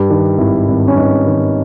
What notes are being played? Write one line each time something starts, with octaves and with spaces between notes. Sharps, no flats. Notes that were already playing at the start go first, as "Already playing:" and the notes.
Already playing: G2 G4
D#3
G#1 E4
G#1
C#4
G2 D#4
D#3